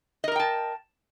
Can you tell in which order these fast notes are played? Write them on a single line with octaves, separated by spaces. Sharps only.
D#5 A#4 A#5 G5 A5